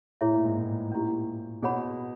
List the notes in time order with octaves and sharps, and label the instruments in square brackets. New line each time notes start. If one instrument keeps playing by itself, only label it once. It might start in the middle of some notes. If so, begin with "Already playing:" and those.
[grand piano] A2 [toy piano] E4 G#4 C#5 E5
[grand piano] A#2
G#2
A2
[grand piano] A#2 [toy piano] C#4 E4 G4
[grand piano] B2 [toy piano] G#4 C#5 F#5 B5